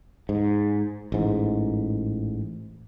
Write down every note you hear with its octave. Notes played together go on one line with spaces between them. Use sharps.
G#2
A1 G#2